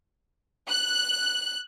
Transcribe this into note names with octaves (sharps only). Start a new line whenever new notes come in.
F#6